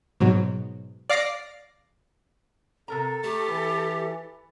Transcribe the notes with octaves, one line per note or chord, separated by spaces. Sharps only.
G#2 B2 F#3
D5 F5 D6 A#6 C7 D7
C3 A4 A#4 A#5
A3 G4
E3 B4